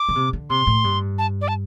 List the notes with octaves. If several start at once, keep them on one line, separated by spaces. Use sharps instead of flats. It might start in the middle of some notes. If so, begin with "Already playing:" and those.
Already playing: D6
D3
C3
D3
C3 C6
A2
G2
A5
D5
A5